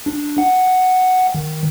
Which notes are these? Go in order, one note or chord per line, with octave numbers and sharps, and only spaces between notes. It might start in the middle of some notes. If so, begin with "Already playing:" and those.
D4
F#5
D#3